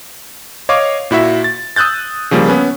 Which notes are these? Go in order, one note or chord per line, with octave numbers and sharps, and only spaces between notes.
C#5 D#5 F5 C#6 D6
A#2 E4 F#4 E5
A6
D#6 E6 F#6 G6 A6
C#3 F3 G3 A#3
B3 C#4 B4